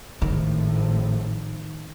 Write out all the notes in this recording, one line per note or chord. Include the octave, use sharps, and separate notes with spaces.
G#1 A2 D#3 F3